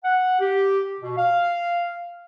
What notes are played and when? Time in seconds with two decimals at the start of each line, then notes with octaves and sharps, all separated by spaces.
0.05 F#5
0.40 G4
1.01 B2
1.17 F5